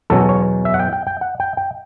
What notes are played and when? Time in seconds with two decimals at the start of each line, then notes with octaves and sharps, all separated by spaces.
0.10 E2 B2 F#3 C#4 A4
0.29 C#5
0.65 E5
0.74 F#5
0.79 G5
0.93 G5
1.07 G5
1.21 F#5
1.40 G5
1.57 G5